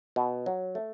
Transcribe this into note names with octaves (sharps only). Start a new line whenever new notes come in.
B2
F#3
A3